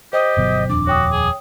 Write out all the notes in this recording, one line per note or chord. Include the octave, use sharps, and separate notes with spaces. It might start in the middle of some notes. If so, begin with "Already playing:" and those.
G4 C5 D#5 G5
G1 B2 F#3
D#1 F2 D4 D6
F#4 C#5 G5 D#6
G#4